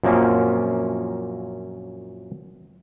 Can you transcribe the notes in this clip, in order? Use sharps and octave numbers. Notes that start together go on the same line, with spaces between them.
F#2 A#2 F3 A#3 C4 C#4